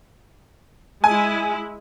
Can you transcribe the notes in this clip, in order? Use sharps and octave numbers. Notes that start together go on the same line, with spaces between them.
G#3 E4 G#5